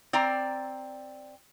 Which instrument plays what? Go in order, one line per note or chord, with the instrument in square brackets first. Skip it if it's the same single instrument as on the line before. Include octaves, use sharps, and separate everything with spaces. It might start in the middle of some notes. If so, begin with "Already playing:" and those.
[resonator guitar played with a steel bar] C4 D5 A#5